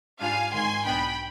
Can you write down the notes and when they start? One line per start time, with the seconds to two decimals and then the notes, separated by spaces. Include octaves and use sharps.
0.20 G#2 G3 D4 F4 F5 G#5
0.52 G#1 G#2 D#3 G#5 C6
0.85 B1 B2 B3 D4 G5 B5